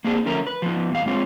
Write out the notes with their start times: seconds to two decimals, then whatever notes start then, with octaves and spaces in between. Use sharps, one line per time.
0.04 A#3 C4 D4 G#4
0.26 D3 F3 A3 C#4 A#4
0.47 B4
0.62 F3 B3
0.91 E2 G2 F5
1.06 G#3 C4 F4 C#5